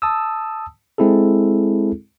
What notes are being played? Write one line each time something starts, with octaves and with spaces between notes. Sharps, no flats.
A5 D#6 E6
G#3 C4 E4 G#4 A4